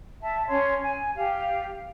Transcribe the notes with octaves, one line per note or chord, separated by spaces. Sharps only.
E5 A5
C#4 C#5 C6
G#5
G4 F5